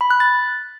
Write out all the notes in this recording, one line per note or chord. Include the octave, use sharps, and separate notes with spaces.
B5
F#6
A6